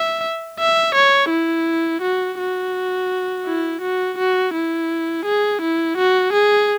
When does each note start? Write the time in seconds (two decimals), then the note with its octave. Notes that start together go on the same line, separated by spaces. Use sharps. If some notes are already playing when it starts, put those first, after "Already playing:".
Already playing: E5
0.59 E5
0.95 C#5
1.30 E4
2.02 F#4
2.39 F#4
3.46 E4
3.81 F#4
4.17 F#4
4.54 E4
5.25 G#4
5.61 E4
5.97 F#4
6.33 G#4